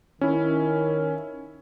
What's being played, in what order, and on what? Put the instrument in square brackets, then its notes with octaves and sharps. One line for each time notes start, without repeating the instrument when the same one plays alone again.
[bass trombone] D#3 [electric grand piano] C#4 E4